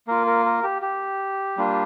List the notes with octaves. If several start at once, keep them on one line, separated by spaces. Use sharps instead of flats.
A#3 F4 A#4
A#4
A#4
G4
G4
G3 A#3 D4 F4